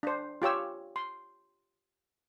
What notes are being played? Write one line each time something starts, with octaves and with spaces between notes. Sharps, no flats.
D4 C5
F4 G4 C#5 E6
C6